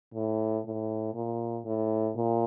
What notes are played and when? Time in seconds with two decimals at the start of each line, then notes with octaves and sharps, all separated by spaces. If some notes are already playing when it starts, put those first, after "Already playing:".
0.14 A2
0.65 A2
1.15 A#2
1.65 A2
2.16 A#2